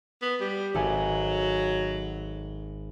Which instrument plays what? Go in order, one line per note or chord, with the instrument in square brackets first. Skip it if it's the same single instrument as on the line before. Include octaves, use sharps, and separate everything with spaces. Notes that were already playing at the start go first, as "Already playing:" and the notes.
[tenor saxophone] B3
G3
[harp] G#1 A4 G#5 [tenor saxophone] F#3